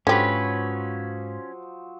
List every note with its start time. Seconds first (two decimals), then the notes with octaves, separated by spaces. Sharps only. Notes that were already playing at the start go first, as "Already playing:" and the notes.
0.07 G#2 D3 F3 F#3 C#4 G4 B4 C5